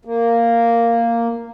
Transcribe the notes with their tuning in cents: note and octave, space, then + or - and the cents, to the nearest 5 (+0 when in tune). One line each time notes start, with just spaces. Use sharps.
A#3 -5